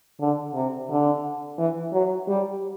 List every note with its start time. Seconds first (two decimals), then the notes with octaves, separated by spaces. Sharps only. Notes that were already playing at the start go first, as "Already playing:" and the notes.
0.20 D3
0.55 C3
0.89 D3
1.58 E3
1.93 F#3
2.28 G3